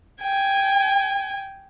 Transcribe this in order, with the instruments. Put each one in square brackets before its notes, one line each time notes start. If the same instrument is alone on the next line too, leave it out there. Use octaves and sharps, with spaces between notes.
[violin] G5 G#5